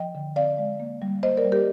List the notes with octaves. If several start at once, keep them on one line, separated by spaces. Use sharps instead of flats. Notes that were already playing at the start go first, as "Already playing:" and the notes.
Already playing: F3 D#5 G5
D3
C4 D5 F5
G#3
A#3
G3
A#3 C5 D#5
A#4 D5
G3
G4 A#4